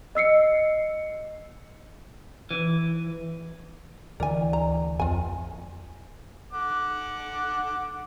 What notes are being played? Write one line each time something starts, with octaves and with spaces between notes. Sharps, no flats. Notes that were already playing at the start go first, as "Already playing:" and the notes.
D#5 E6 C7 C#7
E3
D2 D3 E3 A#4 D5 G#5
A#5
A1 F2 F4 G#5
F#5 D6